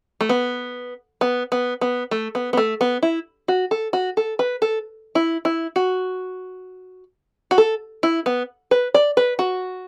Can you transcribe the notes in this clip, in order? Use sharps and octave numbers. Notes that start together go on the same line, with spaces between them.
A3
B3
B3
B3
B3
A3
B3
B3
A3
B3
E4
F#4
A4
F#4
A4
B4
A4
E4
E4
F#4
F#4
A4
E4
B3
B4
D5
B4
F#4